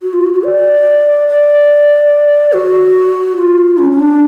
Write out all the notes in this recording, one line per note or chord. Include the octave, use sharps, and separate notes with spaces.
F#4
F4
F#4
F#4
D5
D5
F#4
F4
C#4
C#4
D4